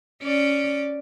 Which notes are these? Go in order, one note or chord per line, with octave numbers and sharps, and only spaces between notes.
C#4 D5